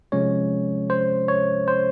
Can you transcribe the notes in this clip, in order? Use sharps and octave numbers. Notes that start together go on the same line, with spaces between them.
C3 F3 G#3 C#4 C#5
C5
C#5
C5